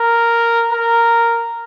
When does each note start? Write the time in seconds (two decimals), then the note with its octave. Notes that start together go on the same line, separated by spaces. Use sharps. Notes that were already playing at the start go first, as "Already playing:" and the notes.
Already playing: A#4
0.72 A#4